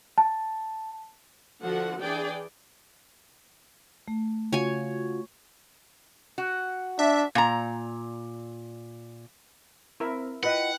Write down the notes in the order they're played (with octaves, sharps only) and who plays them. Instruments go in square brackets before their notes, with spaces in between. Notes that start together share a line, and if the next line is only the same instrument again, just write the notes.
[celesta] A5
[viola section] D3 F3 F#4 A4 F#5
E3 D4 G#4 D5 G5
[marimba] A3
[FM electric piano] C#3 F4 F#4 [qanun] C#5 G#5
[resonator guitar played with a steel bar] F#4
[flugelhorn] D4 [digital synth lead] E5
[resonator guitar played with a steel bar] A#2 A#5
[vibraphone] C4 C5 [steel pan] E4 A#4 E5
[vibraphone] E4 G5 [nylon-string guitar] F4 D#5 [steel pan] B4 [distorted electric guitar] F#5